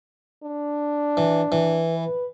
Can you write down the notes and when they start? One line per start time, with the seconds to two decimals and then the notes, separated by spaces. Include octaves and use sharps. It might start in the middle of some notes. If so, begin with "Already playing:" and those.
0.43 D4
1.17 E3
1.52 E3
1.95 B4